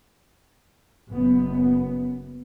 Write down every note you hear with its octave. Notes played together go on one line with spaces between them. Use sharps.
F#1 F#2 B3